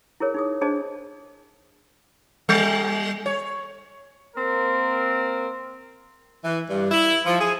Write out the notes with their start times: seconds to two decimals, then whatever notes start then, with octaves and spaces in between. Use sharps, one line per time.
0.20 E4 G#4 A#4 C#5
0.34 D#4 G#4 D#6
0.61 D4 G#4 C5 D#5 A5
2.49 G3
3.26 C#5
4.36 A#3 C4 A#4
6.44 E3
6.69 G2
6.91 E4
7.25 F3
7.40 G#4